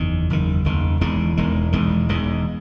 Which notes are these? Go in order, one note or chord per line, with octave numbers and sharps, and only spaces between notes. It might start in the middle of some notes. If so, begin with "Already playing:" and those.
Already playing: F#1 E2 D#3
F#1 E2 D#3
F#1 E2 D#3
E1 E2 D#3 G#3
E1 E2 D#3 G#3
E1 E2 D#3 G#3
E1 E2 D#3 G#3